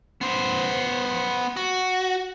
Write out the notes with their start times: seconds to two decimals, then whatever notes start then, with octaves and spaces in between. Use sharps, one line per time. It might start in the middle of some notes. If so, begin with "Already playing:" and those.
0.21 B3 C5
1.56 F#4